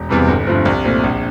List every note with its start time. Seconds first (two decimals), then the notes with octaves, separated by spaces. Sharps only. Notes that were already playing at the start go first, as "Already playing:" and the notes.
Already playing: E1
0.09 E2 C3 E3 G3
0.28 G1
0.47 G2 F3 A3 C4
0.65 C2
0.85 A#2 A3 C4
1.04 A#1